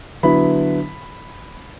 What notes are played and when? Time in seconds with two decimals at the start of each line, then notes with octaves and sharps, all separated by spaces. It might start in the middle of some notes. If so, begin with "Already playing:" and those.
0.23 D3 F#3 B3 E4 B5